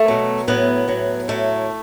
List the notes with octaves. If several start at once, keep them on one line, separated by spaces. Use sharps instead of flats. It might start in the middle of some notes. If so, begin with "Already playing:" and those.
Already playing: A3
B2 F#3
A2 F#3 B3
A2 F#3
A2 F#3 A3